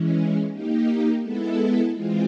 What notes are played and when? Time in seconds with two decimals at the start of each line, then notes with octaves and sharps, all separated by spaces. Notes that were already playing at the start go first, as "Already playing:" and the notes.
Already playing: E3 G#3 C#4
0.51 A#3 D#4 G4
1.22 G#3 B3 E4 A4
1.94 E3 G#3 C4 F4